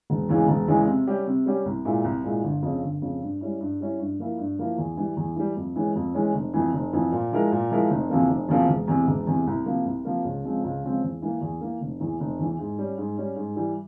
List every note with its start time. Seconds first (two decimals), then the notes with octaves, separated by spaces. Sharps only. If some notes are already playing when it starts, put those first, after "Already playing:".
0.10 E1
0.29 E2 C#3 E3 G#3
0.48 E1
0.68 E2 C#3 E3 G#3
0.87 C3
1.07 G3 C#4 G4
1.27 C3
1.46 G3 C#4 G4
1.66 C2
1.85 A#2 G#3 E4
2.04 C2
2.24 A#2 G#3 E4
2.44 G1
2.62 F2 C#3
2.83 G1
3.02 F2 C#3
3.21 G2
3.41 G3 C#4 E4
3.60 G2
3.80 G3 C#4 E4
3.99 G2
4.19 F3 A#3 E4 A#4
4.39 G2
4.59 F3 A#3 E4 A#4
4.78 E2
4.97 E3 G3
5.17 E2
5.36 E3 G3
5.56 F2
5.76 E3 G#3 C#4
5.95 F2
6.14 E3 G#3 C#4
6.34 F1
6.53 F2 E3
6.73 F1
6.93 F2 E3
7.12 A#2
7.32 F3 G#3 E4 A#4
7.52 A#2
7.71 F3 G#3 E4 A#4
7.90 F1
8.10 E2 C3 F3 A#3
8.29 F1
8.48 E2 C3 F3 A#3
8.68 E1
8.88 E2 C3
9.07 E1
9.27 E2 C3
9.47 C2
9.66 C3 F3 A#3
9.85 C2
10.05 C3 F3 A#3
10.25 C#2
10.44 C#3 F3 G#3 C4
10.64 C#2
10.84 C#3 F3 G#3 C4
11.03 E2
11.22 E3 A#3
11.41 E2
11.61 E3 A#3
11.81 F1
12.00 E2 E3
12.20 F1
12.39 E2 E3
12.59 G#2
12.79 G3 C#4
12.98 G#2
13.18 G3 C#4
13.36 G#2
13.56 E3 G3